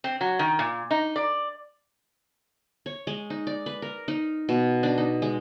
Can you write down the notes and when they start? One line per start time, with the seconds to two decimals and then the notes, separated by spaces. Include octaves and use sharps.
0.04 C4
0.21 F#3
0.39 D#3
0.59 A#2
0.91 D#4
1.16 D5
2.86 C#5
3.07 G#3
3.30 D#4
3.47 D5
3.66 B4
3.82 A#4
4.08 D#4
4.49 B2
4.83 D4
4.98 D#4
5.22 G#3